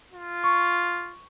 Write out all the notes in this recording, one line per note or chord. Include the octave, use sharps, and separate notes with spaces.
F4
C#6